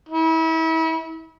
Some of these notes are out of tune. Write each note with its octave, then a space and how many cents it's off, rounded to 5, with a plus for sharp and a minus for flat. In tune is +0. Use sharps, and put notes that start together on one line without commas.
E4 -35